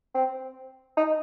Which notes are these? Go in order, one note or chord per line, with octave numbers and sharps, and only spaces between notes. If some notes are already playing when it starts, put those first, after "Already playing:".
C4
D#4